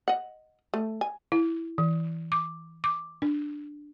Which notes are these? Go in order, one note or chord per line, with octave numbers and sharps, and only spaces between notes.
D#5 F#5
A3
G#5
E4
E3
D6
D6
D4